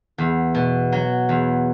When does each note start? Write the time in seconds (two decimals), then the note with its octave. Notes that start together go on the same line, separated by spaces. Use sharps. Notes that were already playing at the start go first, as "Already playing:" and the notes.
0.18 E2
0.55 B2
0.92 F#3
1.29 E2